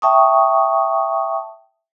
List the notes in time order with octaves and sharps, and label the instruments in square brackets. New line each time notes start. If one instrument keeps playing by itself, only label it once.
[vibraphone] E5 G5 A5 C#6 D#6